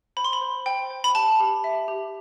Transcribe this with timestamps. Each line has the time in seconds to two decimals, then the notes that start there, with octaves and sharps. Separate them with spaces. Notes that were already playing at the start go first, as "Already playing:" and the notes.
0.17 C5 B5
0.24 C6
0.33 B5
0.41 C5
0.66 C5 G5
0.90 C5
1.04 B5
1.15 G4 A5
1.40 G4
1.64 E5
1.88 G4